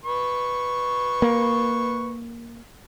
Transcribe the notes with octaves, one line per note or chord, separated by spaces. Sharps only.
B4 C#6
A#3